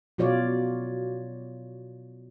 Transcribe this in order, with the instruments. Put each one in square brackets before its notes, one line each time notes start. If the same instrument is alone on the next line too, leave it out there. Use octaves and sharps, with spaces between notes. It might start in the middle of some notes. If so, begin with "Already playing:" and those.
[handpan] B2 F#3 F4 C#5 D5